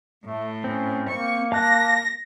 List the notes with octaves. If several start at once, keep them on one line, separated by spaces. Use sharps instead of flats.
A2 A3
C4 C#4
A#3 C#6
F5 A5 F#6 A#6